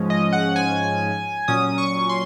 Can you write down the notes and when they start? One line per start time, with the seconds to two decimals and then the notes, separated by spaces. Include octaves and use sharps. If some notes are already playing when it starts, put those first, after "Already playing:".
Already playing: G#2 F3 G#3 C#4
0.10 D#5
0.33 F#5
0.56 G#5
1.48 A#2 F#3 C#4 D#6
1.78 C#6
2.09 C6